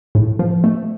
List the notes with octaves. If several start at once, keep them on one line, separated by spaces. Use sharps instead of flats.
A2
F3
A3